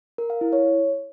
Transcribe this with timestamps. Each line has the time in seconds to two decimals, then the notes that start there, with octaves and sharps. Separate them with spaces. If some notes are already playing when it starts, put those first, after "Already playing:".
0.18 A#4
0.30 F5
0.41 E4
0.53 C#5